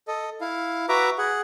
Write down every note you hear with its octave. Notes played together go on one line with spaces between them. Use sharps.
A4 D#5
E4 F5
F#4 B4 E5 A#5 D6
G#4 F#5